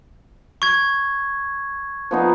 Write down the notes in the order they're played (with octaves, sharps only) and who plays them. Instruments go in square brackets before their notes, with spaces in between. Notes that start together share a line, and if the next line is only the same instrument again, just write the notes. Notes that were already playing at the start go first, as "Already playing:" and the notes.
[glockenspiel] C#6 G#6
[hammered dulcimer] F3 B3 D#4